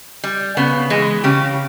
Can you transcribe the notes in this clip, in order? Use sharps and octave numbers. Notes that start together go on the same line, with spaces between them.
G3
C#3 B3
E3 G#3
C#3 G4